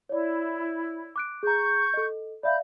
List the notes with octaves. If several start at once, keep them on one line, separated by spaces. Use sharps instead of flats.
E4 C#5 D5
D6 F#6 D7
G#4 A#5 C#6 G6
A4 D#5
D5 E5 F5 B5 G6